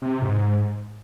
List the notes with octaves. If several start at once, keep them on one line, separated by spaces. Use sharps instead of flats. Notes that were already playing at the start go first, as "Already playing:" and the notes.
C3
C3
G#2